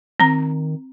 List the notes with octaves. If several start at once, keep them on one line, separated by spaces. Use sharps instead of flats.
D#3 C4 A#5